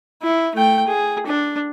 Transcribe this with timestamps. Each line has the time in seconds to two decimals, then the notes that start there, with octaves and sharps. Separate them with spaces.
0.23 E4
0.55 A3 G5
0.87 G#4
1.27 D4